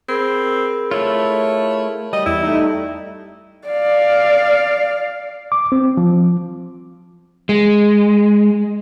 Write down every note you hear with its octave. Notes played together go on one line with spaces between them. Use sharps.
C4 G#4 A#4 B5
A3 E4 F4 C#5
G3 D#5
E2 E4
A3 D#4
D5 F5
D6
C4
F3
G#3